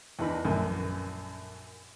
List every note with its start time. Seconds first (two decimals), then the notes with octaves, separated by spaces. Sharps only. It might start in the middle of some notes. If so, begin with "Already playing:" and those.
0.19 E2 E3 D4 D#4 B4 B5
0.45 A#1 F#2 A3